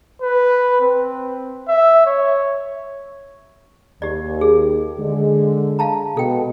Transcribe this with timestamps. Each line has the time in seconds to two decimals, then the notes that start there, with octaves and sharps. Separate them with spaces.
0.22 B4
0.81 C4
1.68 E5
2.06 C#5
4.02 D#2 G4 D5
4.41 G#4
4.99 D3 G#3
5.79 F5 A5 A#5
6.17 B2 A4 G5